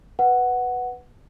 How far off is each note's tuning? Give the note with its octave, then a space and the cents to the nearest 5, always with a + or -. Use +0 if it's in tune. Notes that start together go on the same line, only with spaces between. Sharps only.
B4 +0 F#5 +0